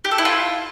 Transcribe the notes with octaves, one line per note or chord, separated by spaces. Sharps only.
G4
A4
E4
F4